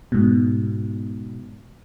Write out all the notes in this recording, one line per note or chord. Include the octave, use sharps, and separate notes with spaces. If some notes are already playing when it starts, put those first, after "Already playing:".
G#2 B2